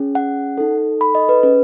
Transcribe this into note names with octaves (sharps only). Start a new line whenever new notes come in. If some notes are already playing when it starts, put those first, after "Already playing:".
Already playing: C#4 G#4
F#5
D#4 A4
B5
D#5
B4
C#4 G#4 B4